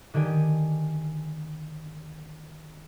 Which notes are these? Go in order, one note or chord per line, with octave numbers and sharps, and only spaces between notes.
D3 D#3 G4 G#5 D#7